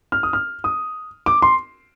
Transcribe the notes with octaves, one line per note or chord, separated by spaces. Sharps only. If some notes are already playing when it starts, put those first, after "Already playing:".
F6
D#6
F6
D#6
D6
C6